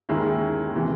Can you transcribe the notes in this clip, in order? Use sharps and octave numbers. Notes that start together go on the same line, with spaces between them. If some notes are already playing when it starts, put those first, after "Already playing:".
D#2 D#3 G#3 C#4 E4
C3 E3 G#3